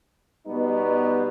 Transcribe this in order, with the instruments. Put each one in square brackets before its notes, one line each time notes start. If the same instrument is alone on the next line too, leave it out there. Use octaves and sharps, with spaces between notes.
[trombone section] B2 G3 B3 D#4